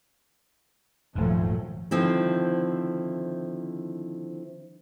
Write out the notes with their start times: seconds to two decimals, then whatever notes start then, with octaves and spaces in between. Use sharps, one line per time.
1.15 D#1 G#2 F3 F#3 A3
1.91 D3 D#3 F3 C4 E4